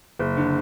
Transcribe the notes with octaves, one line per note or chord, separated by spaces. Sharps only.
F#1
D3